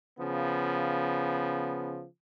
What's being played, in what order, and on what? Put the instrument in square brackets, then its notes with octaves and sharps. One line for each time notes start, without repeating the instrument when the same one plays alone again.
[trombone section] C#3 F3 B3